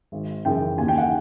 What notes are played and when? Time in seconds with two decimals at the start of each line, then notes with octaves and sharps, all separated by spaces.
0.12 G#1
0.45 F#2 C#3 E3 G5
0.78 D#2 G#5
0.88 G5
0.98 F#5